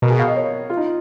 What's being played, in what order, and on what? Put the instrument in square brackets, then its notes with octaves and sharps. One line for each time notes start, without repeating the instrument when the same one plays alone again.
[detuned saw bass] B2 [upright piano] A#4
[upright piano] G#4
F5
D#5
C#5
F4
D#4